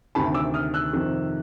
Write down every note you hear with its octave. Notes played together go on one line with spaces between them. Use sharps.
D2 C3 D#3 A5 B5
D6 E6
D#6 F6
E6 F#6
F2 C3 D#3